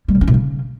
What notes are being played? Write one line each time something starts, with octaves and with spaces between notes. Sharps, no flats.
G3
C#3
C#4
C3
C#3